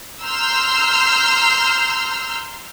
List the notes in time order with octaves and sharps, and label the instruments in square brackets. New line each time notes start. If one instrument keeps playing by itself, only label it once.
[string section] A#5 C6 E6 F6 G6 C7